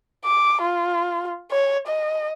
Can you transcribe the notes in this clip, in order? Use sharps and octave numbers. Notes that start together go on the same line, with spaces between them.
D6
F4
C#5
D#5